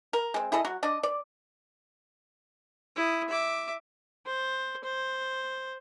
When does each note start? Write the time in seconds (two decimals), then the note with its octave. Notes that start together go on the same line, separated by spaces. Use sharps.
0.13 A#4
0.34 G#3 C4
0.52 E4 G#4 A4 D#5
0.65 F#3 F#4
0.83 D4 D5 D#5
1.03 D5
2.96 E4 D#6
3.29 E5 D6
4.27 C5
4.84 C5